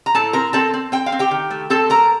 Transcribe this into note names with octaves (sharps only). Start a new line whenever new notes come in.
A#5
A2 A4 A5
C4 A#4 A#5
C4 A4 A5
C4
C4 G5
F5
C4
G4 G5
D#3
A3
C4 A4 A5
A3 A#4 A#5